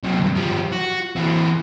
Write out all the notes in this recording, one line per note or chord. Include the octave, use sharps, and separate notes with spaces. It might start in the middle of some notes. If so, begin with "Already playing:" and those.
C3 F#3
D2 G2
F3 G3
F#4
E3 C4